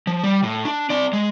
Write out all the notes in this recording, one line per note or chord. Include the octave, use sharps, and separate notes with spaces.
F3
G3
A2
D4
C4 D5
G#3